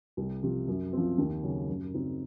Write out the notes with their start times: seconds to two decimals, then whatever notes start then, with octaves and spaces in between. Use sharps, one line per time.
0.17 C2
0.43 C3 F3
0.68 F#2
0.93 F3 C4
1.18 D#2
1.43 C#3 F#3 C#4
1.68 F#2
1.93 C#3 F#3 C4 D#4